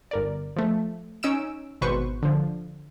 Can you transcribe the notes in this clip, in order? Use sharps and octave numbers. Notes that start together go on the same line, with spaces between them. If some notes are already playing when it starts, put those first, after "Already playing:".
G1 A#4 D5
F3 A3
C#4 D#4 E6 D7 E7
G#1 B2 B4 C5 C#6
D3 F3